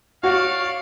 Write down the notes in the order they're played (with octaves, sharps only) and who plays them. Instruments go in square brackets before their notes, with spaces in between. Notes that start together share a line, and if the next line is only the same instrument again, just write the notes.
[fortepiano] F#4 [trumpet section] C#5 D5 F5